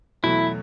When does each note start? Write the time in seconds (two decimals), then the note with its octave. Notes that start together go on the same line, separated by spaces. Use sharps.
0.23 E2 B2 F#3 A3 E4